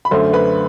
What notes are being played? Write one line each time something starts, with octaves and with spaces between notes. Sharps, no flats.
B5
F#2 D3 A3 C5 C6
B4 B5